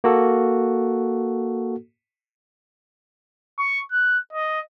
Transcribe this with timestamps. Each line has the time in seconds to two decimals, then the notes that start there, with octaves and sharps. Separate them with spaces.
0.04 A#3 F#4 A4
3.58 C#6
3.92 F#6
4.33 D#5